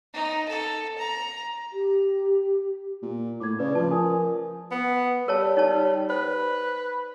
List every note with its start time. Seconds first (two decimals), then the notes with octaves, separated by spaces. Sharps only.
0.14 D#4
0.48 A4
0.98 A#5
1.73 G4
3.02 A#2
3.40 A2 D6 G#6
3.59 C#3 B4 D5
3.75 F3 A5
3.91 A#4 G#5 D#6
4.71 B3
5.28 G3 A#4 C#5 A5
5.57 D#4 C#5 A5
6.10 B4 C5